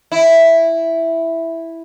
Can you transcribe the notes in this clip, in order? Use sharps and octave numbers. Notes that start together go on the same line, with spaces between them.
E4